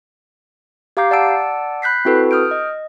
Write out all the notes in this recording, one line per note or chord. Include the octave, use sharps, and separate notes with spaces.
G4 F5 A#5 D6 G6 C7
D5 F#5 A5 D6 E6 D7
B5 F#6 G6 B6 C7
C4 E4 F#4 A4 B4
D#6 F6 G6 D7
D#5